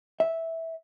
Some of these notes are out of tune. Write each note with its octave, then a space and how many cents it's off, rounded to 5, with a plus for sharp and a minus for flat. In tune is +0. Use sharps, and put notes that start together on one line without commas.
E5 -10